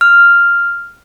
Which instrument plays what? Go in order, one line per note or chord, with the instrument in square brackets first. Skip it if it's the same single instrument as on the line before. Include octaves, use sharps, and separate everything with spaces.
[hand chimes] F6